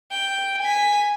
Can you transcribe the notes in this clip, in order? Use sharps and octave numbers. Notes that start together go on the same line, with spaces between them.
G5
G#5 B6